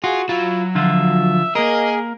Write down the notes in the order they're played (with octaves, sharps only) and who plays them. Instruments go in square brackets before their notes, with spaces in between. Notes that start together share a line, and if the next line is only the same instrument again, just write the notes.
[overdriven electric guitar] F4 [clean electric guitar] F#4 [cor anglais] G#4
[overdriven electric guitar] F#3 [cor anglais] E4 [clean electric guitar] F4
[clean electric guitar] D3 F3 F4 [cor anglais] E5
[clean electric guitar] A#3 A#4 [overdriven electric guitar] G#4 [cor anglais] D#5